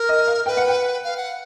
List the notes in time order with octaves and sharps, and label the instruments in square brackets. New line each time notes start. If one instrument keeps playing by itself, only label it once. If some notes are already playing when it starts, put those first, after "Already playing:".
Already playing: [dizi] A#4
[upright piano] D#5
F5
[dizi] B4 [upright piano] G5
[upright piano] F#5
G5
[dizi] F5
F#5